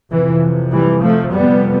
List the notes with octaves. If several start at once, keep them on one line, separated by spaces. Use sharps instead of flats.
F2 C3 E3
E3 G3
F3 A3
F2 C3 G3 B3